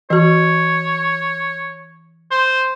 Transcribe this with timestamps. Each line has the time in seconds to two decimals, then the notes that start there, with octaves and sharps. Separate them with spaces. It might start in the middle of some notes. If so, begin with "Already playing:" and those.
0.10 E3 F#4 C#5
2.31 C5